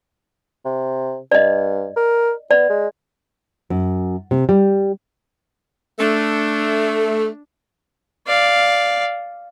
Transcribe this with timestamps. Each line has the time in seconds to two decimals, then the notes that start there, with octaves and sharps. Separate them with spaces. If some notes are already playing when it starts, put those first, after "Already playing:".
0.65 C3
1.32 G2 D5 D#5
1.96 A#4
2.51 B3 D5
2.69 G#3
3.70 F#2
4.31 C3
4.49 G3
5.99 A3 D4
8.27 D5 F5